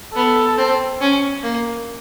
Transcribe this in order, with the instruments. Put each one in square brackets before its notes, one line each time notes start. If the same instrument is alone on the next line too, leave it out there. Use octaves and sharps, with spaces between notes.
[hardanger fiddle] B3 [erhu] A4
[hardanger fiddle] C4
C#4
A#3